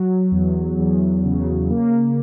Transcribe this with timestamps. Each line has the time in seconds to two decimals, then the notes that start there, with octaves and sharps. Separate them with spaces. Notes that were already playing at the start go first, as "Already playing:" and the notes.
Already playing: F#3
0.31 E2
0.78 E2
1.24 C#3
1.70 A#3